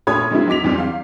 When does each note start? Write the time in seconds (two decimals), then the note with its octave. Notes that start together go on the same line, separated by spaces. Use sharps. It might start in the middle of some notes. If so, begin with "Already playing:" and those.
0.07 A#2 A3 C#5 B5 D#6 G#6
0.31 D3 F#3 G#3 A#3 C4 E4
0.47 F#3 D#4 D6 B6 F7
0.64 E2 D3 E3 F#3 G3 C4
0.78 F5